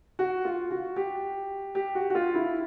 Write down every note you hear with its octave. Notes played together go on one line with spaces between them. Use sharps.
F#4
F4
F#4
G4
G4
F#4
F#4
F4
E4